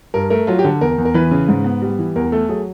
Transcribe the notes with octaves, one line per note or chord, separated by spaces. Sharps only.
G2 A#4
A3 A#4
F#3 F4
G4
D3
E2 A#4
E2
A#4
E3 B4
C#3
G#2
B3
G3
E3
E2 A#4
A3 A4
F#3 G#4